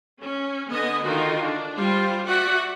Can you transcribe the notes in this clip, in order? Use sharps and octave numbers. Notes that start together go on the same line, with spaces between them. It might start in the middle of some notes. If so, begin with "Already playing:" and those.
C#4
D3 B3 D#5 G#5
D3 D#3 D#4 F4 F#4 A#4
D4
G3 F4 C5
F#4 D5 E5 F#5